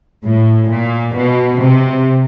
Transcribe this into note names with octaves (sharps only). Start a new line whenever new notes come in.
A2
A#2
B2
C3